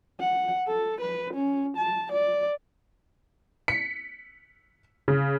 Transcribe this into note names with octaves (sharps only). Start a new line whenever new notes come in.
F#5
A4
B4
C#4
A5
D5
B6 C#7
C#3